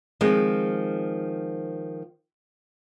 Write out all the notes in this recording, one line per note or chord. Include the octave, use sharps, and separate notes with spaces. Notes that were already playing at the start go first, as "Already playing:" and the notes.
D#3 F3 G#3 C4